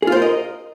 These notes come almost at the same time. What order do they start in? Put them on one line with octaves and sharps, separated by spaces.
G#4 F4 C5 A#4 D#5